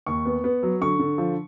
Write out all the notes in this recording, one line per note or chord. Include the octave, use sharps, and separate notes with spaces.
D#2 C#6
B3
B3
F#3
D3 C#6
D3
F3